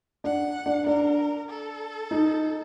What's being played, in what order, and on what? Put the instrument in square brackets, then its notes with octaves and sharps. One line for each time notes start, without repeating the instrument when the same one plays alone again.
[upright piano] D4 [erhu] F#5
[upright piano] D4
[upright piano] D4 [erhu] A#4
[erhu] A4
[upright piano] D#4